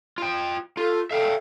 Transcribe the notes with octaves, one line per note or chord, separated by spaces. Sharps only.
F4 G5
F4 A4
A4 E5 F5 G5